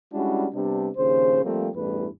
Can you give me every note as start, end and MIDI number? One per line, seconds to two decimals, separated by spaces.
0.13 0.46 55
0.13 0.46 56
0.13 0.46 61
0.13 0.46 62
0.13 0.46 64
0.13 0.46 66
0.53 0.90 48
0.53 0.90 55
0.53 0.90 59
0.53 0.90 62
0.97 1.44 34
0.97 1.44 39
0.97 1.44 49
0.97 1.44 72
1.44 1.68 53
1.44 1.68 55
1.44 1.68 57
1.44 1.68 58
1.44 1.68 60
1.75 2.07 33
1.75 2.07 40
1.75 2.07 43
1.75 2.07 55
1.75 2.07 57
1.75 2.07 71